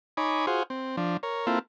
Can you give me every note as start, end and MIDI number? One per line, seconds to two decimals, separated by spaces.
0.17 0.46 63
0.17 0.46 73
0.17 0.46 80
0.17 0.46 83
0.17 0.46 86
0.47 0.63 65
0.47 0.63 66
0.47 0.63 68
0.47 0.63 72
0.70 0.96 60
0.97 1.17 53
0.97 1.17 62
1.23 1.46 70
1.23 1.46 73
1.47 1.59 58
1.47 1.59 60
1.47 1.59 64
1.47 1.59 65
1.47 1.59 69